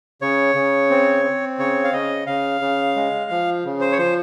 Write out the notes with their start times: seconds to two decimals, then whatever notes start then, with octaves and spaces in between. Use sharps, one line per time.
0.22 C#3 C#5
0.55 C#3
0.90 C4
1.24 C4
1.58 C#3 C#5
1.84 F5
1.93 C#3 D#5
2.27 C#3 F5
2.61 C#3
2.96 G#3
3.31 F3
3.65 C#3
3.81 C5
3.92 C#5
3.98 F3 C5